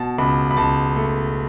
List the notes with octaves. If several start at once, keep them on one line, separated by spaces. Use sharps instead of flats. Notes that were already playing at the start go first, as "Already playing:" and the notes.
Already playing: B2 A5
C#2 B5
B5
C#2 A5
A3